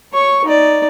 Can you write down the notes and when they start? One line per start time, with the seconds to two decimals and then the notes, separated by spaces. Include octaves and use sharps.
0.13 C#5 C#6
0.45 D#4 D5